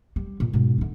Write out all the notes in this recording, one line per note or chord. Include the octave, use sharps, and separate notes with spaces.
G3
A#2
G#2 B2
D3 D#4